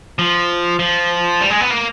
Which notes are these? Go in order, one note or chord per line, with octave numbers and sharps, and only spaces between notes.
F3
F3
G3
G#3
B3
A#3